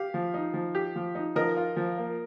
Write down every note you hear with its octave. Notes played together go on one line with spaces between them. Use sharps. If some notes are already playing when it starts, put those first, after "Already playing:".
Already playing: G4 F5
F3
D#4
F3
G4
F3
D#4
F3 A#4 D#5
F4
F3
A#3